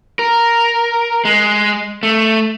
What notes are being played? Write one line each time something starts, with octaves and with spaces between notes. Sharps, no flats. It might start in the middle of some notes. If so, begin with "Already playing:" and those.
A#4
G#3
A3